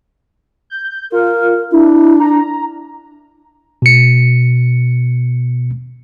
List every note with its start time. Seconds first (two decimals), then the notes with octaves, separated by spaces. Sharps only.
0.70 G6
1.12 F4 A#4
1.72 D4 E4
2.20 A#5
3.82 B2 C#7